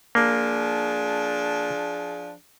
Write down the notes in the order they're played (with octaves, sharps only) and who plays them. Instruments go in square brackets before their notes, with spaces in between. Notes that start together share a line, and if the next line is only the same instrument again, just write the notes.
[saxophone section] F3 D4 G#4 [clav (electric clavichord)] A#3